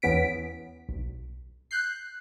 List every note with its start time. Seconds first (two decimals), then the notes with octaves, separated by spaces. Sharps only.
0.02 E2 E3 B3 C#4 B6 D7
0.89 B1
1.71 F#6 G6 C7